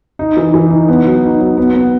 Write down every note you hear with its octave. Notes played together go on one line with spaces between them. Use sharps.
D#4
E3
E3
D#4
B3
F#3
D#4
F#3
B3
B3